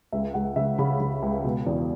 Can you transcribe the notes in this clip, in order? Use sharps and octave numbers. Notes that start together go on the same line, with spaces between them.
C#2 E5
C#2 F#5
C#3 E5
C#3 B5
C#3
C#2
B2
E2